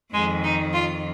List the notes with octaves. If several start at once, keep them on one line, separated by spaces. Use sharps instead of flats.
F2 D#3 G#3
D#4
F4